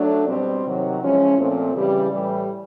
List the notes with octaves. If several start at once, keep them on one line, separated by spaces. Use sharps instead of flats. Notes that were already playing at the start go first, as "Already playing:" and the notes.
Already playing: F#3 A3 D4
B2 G3 C4
C3 D#3 F#3
F3 G#3 C#4 E4
A#2 F3 A3 C4
C#3 E3 G3
A2 E3 G3